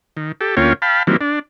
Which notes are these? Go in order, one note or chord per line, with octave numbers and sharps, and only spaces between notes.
D#3
G4 A4
D2 A#3 C#4 F4 C#5 G5
F5 G5 A5 B5
D#3 E3 F#3 G3 A#3 C4
D4